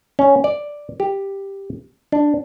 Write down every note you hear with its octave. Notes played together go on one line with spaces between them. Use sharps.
C#4
D5
G4
D4